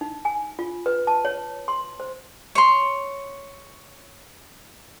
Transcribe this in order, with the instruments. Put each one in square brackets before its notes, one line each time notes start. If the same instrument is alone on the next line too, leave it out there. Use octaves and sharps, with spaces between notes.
[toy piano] D#4
G#5
F4
B4
A5
C#5
C6
C5
[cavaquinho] C#5 C6